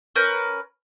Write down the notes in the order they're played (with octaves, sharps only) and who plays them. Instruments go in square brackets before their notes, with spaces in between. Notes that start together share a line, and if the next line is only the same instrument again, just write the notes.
[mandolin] C#4 A#4 B4 G6